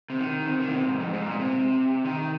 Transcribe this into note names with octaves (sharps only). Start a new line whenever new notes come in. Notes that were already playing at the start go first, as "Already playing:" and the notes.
C3
D#3
C3
D#3
A#2
C3
G#2
F2
G#2
A#2
C3
D#3